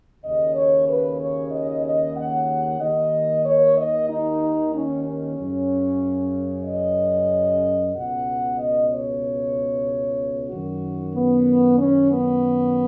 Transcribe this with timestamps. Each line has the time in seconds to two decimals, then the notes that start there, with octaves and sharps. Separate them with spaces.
0.24 D#2 C#3 D#5
0.55 C#5
0.88 B4
1.19 C#5
1.51 D#5
1.85 D#5
2.16 F#5
2.80 D#2 D#3 D#5
3.45 C#5
3.77 D#5
4.09 D#4
4.73 C#4
5.04 C#4
5.37 F#2 C#3
6.65 D#5
7.93 C#2 B2 F#5
8.58 D#5
8.89 C#5
10.50 F#2 D#3 F#4
11.15 B3
11.78 C#4
12.11 B3